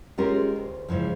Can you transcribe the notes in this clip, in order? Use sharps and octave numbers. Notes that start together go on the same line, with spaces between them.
G#3 C#4 F4 G4 A#4
D2
G#2 C#3 E3 F3